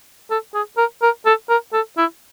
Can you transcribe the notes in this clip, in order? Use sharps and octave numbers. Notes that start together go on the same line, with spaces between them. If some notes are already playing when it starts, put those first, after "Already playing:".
A4
G#4
A#4
A#4
A4
A#4
A4
E4